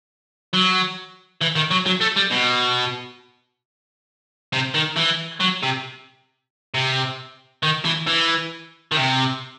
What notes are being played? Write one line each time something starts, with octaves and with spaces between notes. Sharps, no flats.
F#3
E3
D#3
F#3
F#3
A3
G3
B2
C3
D#3
E3
F#3
C3
C3
D#3
E3
E3
D#3
C3